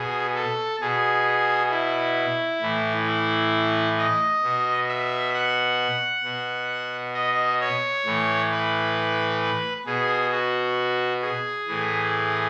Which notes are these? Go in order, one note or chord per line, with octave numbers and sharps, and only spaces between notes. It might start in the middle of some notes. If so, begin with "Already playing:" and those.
Already playing: B2 G#4
A4
B2 G#4
E4
A2 E3
E4
D#5
B2
E5
F#5
B2
D#5
C#5
A2 E3
B4
B2 G#4
F#4
G#4
A2 E3